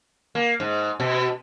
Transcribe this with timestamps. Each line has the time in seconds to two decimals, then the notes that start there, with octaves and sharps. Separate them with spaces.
0.35 A#3
0.60 G#2
1.00 B2